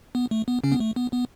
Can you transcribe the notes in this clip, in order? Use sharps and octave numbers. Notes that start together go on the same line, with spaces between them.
B3
A3
B3
C#3 C#4
B3
A3
B3
B3